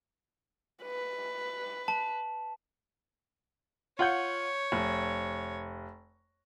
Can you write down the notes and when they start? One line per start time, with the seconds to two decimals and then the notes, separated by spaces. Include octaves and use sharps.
0.83 B4
1.88 A5
3.99 F4 C#5 F#5 G6
4.72 F1